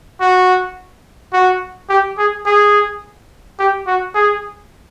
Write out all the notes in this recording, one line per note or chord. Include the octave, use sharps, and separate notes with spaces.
F#4
F#4
G4
G#4
G#4
G4
F#4
G#4